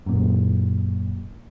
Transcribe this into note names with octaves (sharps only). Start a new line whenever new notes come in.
F#2 A#2